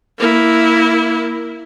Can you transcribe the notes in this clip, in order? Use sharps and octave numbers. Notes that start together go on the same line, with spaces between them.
A#3 E4